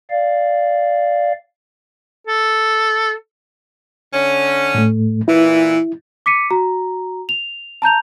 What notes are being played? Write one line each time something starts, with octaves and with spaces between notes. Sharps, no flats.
D5 F5
A4
D3 C#4
A2 A3
A#2 E3 E4
D6 B6 C#7 D#7
F#4 A#5
F7
A5 A#5 G6 F7